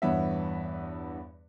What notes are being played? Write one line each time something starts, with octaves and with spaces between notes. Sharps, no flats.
E2 G2 B3 C#5 E5